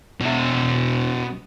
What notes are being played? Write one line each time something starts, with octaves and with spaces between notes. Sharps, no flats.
B2 E5